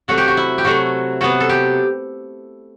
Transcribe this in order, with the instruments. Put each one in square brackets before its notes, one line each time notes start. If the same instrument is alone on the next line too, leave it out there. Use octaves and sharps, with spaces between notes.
[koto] C3 F#3 A3 F#4
G4
F#4
E4
G4
C3 F#3 A3 F#4
C3 F#3 B3 F#4
A4
G4